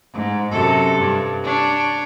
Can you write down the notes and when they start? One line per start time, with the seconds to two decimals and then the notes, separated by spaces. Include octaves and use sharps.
0.14 G#2
0.51 F#2 C3 A4
0.99 G2
1.44 D4 C#5